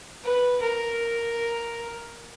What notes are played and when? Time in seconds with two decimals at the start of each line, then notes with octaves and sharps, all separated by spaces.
0.24 B4
0.62 A#4